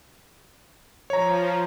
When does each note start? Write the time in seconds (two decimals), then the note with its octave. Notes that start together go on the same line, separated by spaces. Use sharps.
1.10 F3 C#5 A#5